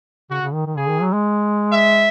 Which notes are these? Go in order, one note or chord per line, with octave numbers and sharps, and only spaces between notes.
C#3 F#4
C#3
D#3
D#3
C#3 G#4
D#3
F#3
G#3
E5